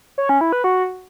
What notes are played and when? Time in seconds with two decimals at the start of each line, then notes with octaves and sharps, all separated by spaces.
0.18 C#5
0.29 C#4
0.41 E4
0.53 B4
0.64 F#4